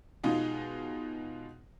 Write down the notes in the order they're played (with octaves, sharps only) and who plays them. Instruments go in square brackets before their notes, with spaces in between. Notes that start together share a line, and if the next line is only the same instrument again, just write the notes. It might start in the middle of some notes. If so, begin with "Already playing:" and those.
[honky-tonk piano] B2 G#3 D#4 F4 G#4